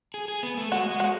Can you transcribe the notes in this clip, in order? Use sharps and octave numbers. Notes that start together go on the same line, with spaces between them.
G#4
G#4
B3
A3
G#3 F#4
G#3
F#4